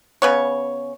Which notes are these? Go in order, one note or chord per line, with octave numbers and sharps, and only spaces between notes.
C#3 B3 C#5